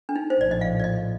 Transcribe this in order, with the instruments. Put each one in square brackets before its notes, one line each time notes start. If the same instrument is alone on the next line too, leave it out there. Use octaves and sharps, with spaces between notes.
[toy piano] D4
D#4
C5
[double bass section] A#1 A2 F3 [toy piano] D5
[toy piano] D#5
F5
D5
D#5